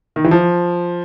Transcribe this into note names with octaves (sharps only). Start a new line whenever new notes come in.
D#3
E3
F3